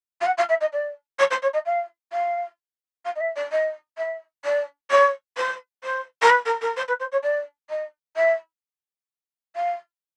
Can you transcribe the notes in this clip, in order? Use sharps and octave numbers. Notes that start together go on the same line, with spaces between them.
F5
F#5
F5
E5
D#5
D5
C#5
C5
C#5
D#5
F5
F5
F5
D#5
E5
D5
D#5
E5
D5
C#5
C5
C5
A#4
B4
A#4
A#4
C5
B4
C5
C#5
D5
D#5
E5
F5